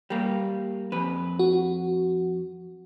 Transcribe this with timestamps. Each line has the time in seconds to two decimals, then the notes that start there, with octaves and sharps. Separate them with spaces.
0.10 G3 A#3
0.92 F2 B4
1.39 F#4